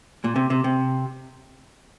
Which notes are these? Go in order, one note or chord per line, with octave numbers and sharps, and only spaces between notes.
A#2
C3
C3
C3